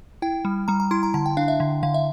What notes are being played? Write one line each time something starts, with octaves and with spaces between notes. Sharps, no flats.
E4 G5
G3
G3 A#5
A#5
E4 C6
A#5
D3 A5
G5
D4 F5
E5
D3
D3 F5
E5